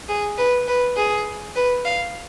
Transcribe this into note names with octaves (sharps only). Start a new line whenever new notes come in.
G#4
B4
B4
G#4
B4
F5